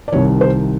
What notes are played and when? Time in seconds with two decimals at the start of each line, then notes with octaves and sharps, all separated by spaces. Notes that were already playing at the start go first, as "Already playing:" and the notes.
0.08 D5
0.12 C2 C3 D#3 C#5
0.41 C5